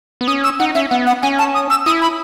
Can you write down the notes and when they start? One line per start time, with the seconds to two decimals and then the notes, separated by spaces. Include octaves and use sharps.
0.21 B3
0.27 C#4 D#6
0.44 E6
0.59 D#4 F#5
0.75 C#4 E5
0.91 B3 F#5
1.07 F#5
1.23 C#4 G#5
1.39 A5
1.54 D#6
1.70 E6
1.86 E4 D#6
2.02 B5